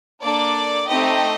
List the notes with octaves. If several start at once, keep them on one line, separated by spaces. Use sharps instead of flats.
A#3 D4 A4 D5
A3 C4 D#4 G4 D#5